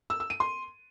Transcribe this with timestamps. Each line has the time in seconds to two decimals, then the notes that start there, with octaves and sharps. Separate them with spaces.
0.10 E6
0.20 E6
0.30 D#7
0.40 C6